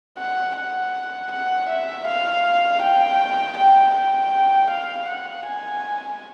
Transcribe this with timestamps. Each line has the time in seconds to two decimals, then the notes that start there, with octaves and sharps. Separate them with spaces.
0.18 F#5
0.56 F#5
1.31 F#5
1.69 E5
2.07 F5
2.82 G5
3.57 G5
3.95 G5
4.70 F5
5.08 F#5
5.46 G#5